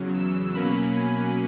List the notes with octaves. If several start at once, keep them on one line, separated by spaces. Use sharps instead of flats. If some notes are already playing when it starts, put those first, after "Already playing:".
Already playing: E2 C#3 F#3
E6
B2 F#3 A#3 C#4 B5
G#5